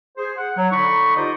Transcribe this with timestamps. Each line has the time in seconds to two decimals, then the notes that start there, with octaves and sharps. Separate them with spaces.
0.18 G#4 C5
0.37 F#5
0.57 F#3
0.72 D3 D#4 D5 B5 C#6
1.16 D#4 F4 G4 C5 D5 D#5